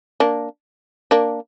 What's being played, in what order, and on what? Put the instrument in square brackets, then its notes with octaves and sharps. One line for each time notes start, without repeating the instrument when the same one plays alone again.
[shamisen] A#3 D4
A#3 D4